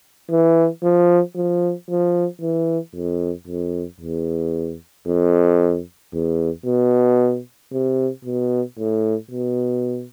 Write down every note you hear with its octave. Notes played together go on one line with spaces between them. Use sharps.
E3
F3
F3
F3
E3
F2
F2
E2
F2
E2
B2
C3
B2
A2
B2